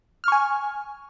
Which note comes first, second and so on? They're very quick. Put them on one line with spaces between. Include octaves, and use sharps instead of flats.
F6 C#6 G#5